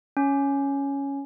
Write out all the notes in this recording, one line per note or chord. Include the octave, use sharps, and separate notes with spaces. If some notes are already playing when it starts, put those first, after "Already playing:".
C#4